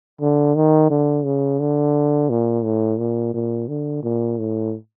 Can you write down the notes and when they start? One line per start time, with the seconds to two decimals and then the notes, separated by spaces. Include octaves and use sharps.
0.21 D3
0.55 D#3
0.90 D3
1.25 C#3
1.60 D3
2.30 A#2
2.64 A2
2.99 A#2
3.34 A#2
3.68 D3
4.03 A#2
4.39 A2